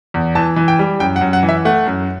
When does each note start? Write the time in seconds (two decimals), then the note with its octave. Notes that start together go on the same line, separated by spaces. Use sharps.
0.14 E2
0.35 E3 A5
0.56 E3
0.68 G5
0.79 G3
1.00 F#2 G5
1.16 F#5
1.21 F#2
1.33 F#5
1.43 E3
1.49 E5
1.65 A3 F#5
1.87 F#2